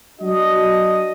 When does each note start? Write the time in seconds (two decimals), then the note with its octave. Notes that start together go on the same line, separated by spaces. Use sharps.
0.20 F#3 D4 F#4 D#5